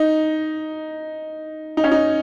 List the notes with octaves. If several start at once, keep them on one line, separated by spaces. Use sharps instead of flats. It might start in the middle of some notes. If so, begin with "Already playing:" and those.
Already playing: D#4
D#4
C#4
D#4